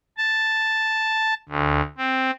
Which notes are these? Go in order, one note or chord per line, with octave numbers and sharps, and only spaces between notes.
A5
D2
C4